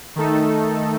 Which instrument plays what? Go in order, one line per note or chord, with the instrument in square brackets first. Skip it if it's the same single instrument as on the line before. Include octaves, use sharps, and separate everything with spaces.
[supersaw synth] D#3 A3 D#4 A4